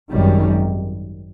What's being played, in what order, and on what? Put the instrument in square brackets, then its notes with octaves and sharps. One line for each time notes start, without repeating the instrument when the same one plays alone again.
[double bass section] G#1 F#2 D#3 G3